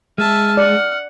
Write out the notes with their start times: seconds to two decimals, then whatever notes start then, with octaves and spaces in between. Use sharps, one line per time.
0.18 G#3 E5 A5 F6
0.57 D5 F#5